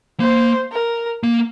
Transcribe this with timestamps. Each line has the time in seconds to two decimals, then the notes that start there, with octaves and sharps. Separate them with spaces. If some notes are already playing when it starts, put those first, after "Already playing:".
0.20 A#3 C5
0.72 A#4
1.23 A#3